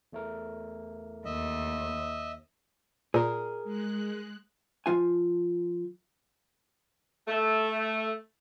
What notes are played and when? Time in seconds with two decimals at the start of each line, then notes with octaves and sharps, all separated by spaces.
0.13 E2 A3 A#4
1.25 D#2 D#5 E5
3.14 A#2 G#4 A#4
3.64 G#3 F#6
4.86 F3 F4 G#5
7.28 A3